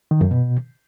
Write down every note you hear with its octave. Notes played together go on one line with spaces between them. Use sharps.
D#3
F#2
B2